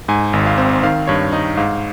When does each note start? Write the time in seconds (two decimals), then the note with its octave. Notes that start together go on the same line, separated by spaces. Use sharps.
0.09 G#2 G#5
0.33 G#1
0.46 F5
0.58 C4
0.83 D#3 F5
1.07 G2 C#5
1.33 D#4 D#5
1.57 G#2 F5